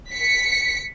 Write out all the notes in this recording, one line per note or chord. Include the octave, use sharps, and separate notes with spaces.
B6 C#7